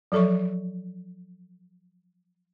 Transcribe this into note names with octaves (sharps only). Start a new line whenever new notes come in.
F3 F#3 A4 E5 C#6